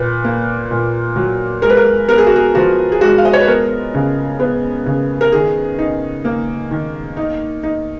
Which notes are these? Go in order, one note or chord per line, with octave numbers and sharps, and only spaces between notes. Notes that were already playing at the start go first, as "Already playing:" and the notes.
Already playing: A#2 B4
A#3
A#2
F#3
G#3 A#4
B4
A#4
B3 A#4
G#4
F#4
G#4
F3 F#4
G#4
G#3 F#4
F5
D#5
C#5
B4
B3 A#4
C#3
B3
C#3
A#4
D#3 G#4
D#4
A#3
D#3
D#4
D#4